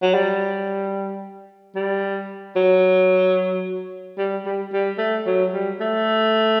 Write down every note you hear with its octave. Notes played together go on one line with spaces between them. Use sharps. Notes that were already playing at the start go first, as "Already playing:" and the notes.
F#3
G3
G3
F#3
G3
G3
G3
A3
F#3
G3
A3